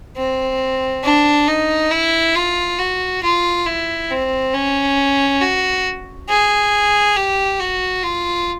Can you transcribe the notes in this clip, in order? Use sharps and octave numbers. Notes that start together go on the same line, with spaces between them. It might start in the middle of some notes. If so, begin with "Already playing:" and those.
C4
D4
D#4
E4
F4
F#4
F4
E4
C4
C#4
F#4
G#4
G4
F#4
F4